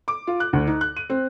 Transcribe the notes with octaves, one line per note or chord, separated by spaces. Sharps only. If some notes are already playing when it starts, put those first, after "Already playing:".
D6
F4
F#6
D2
D#4
F#6
D#7
C4